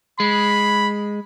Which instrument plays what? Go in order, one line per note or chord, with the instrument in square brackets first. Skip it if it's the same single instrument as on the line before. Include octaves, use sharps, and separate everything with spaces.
[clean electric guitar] G#3 [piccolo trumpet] B5